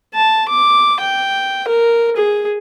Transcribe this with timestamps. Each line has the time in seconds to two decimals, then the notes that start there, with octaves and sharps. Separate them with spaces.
0.14 A5
0.48 D6
1.00 G5
1.68 A#4
2.16 G#4